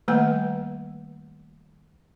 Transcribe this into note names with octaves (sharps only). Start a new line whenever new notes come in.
D#3 G3 A3 A#3 B4 F#5